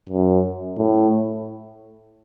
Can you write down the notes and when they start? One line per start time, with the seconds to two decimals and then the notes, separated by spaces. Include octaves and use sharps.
0.10 F#2
0.77 A2